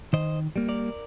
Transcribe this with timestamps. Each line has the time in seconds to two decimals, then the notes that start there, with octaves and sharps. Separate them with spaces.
0.13 D#3 C5 D#5
0.56 G3 A#3
0.68 A#4 D5